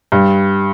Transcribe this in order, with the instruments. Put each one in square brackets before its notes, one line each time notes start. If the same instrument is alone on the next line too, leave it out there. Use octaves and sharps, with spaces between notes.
[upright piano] G2